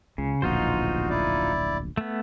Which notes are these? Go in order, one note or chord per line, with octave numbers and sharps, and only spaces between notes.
C#2 C#3
D1 A#1 B2 D#4 F4 F#4 C5
E4 D5
A3 B3